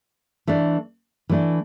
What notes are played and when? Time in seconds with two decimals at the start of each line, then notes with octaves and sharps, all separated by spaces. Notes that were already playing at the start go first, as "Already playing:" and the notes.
0.47 E3 A3 D4
1.29 E3 A3 D4